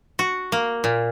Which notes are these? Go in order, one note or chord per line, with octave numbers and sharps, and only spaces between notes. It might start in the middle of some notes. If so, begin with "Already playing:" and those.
F#4
A#3
A#2